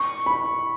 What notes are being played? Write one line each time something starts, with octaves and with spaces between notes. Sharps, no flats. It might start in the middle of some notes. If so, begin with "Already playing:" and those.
Already playing: C#6
B5